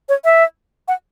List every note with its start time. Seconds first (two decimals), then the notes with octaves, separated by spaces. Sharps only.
0.09 C#5
0.25 E5
0.88 F#5